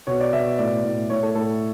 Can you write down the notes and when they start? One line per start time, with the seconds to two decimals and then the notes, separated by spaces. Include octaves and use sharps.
0.07 B2 C#5
0.20 D5
0.33 B2 E5
0.58 A2 D5
0.84 A2
1.10 A2 C#5
1.23 A4
1.35 A2 A4